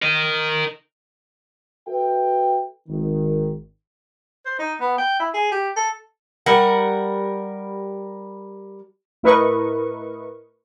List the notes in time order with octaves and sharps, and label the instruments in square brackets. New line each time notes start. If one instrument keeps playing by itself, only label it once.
[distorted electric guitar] A#4 D#5
[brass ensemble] F#4 A4 B4 E5 G5
G#1 D#3
[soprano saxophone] C5
D#4
B3
G5
E4
G#4
G4
A4
[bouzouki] G3 A#4 F#5
[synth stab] A2 E4 A#4 B4 D#5 C#6